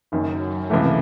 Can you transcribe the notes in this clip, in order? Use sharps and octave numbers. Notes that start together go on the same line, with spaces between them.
F#1 F#2 D#3 F#3
C#2 C3 E3 A3 C#4